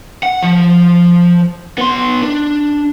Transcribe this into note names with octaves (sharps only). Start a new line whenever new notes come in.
F#5
F3
B3 C6
D4